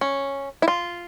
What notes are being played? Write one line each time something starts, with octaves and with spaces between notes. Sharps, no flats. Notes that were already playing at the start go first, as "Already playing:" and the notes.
C#4
E4
F4